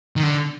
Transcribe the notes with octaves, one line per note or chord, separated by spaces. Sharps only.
D#3
D3